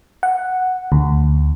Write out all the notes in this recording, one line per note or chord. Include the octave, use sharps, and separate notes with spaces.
F#5
D2